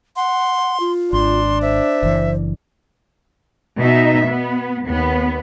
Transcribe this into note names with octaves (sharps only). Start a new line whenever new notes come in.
F#5 C6
F4
G#1 D4 C6
C5 E5
F#1 E3
B2 D#4 E5
B3
D#2 B3